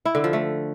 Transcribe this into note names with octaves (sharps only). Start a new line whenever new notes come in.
E4
D3
F3
A3